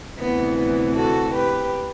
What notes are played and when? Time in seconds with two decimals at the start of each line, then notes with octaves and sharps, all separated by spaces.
0.18 D2 C3 E3 B3
0.57 B3
0.96 F#4 A4
1.34 G4 B4